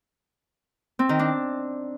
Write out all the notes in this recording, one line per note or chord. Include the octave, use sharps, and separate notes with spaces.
C4
D#3
D4